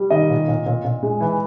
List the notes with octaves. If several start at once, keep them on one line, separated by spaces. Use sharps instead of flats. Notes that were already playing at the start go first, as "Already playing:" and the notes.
Already playing: G3
D#3 D#5
A#2
A#2
A#2
A#2
G#3
E3